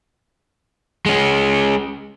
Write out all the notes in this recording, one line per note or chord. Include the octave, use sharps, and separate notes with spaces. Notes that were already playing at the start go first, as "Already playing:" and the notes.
G#3 C#4